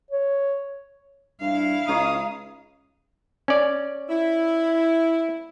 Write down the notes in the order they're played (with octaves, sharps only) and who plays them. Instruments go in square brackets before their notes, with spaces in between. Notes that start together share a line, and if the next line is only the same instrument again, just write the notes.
[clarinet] C#5
[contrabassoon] G2 [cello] E4 F5
[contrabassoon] C#2 [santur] D#4 C#5 [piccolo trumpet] D#6
[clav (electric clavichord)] C#4 D5
[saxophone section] E4